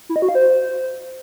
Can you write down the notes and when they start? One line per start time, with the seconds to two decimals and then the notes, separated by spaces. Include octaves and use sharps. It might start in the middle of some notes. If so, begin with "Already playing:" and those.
0.09 E4
0.16 D#5
0.22 F#4
0.29 F5
0.35 C5